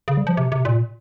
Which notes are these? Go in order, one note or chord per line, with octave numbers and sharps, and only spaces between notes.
C#3
G3
F3
C3
C3
A#2